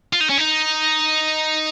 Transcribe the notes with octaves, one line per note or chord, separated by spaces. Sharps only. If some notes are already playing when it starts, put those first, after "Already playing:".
F4
D#4
C#4
D#4